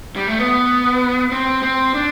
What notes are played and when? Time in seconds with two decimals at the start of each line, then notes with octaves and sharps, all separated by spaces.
0.16 G3
0.28 A3
0.39 B3
1.32 C4
1.63 C4
1.94 D4